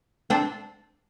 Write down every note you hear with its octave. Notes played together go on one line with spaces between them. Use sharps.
C4 D4